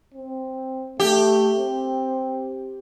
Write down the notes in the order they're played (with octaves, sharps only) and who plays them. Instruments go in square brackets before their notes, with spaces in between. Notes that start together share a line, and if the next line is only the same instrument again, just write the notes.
[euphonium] C4
[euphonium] A3 [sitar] G4
[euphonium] C4